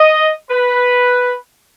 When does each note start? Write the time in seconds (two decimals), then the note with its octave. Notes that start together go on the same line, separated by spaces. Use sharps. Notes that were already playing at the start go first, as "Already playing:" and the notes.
Already playing: D#5
0.50 B4